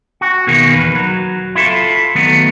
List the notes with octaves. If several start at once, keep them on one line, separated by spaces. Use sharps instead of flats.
F#4
B2 D#3 A#3 G#4
E2 B4
F#3
E4 F4 A4
D#3 F#3 A3 B3